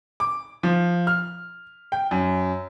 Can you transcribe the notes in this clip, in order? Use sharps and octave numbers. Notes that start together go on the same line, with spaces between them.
D6
F3
F6
G5
F#2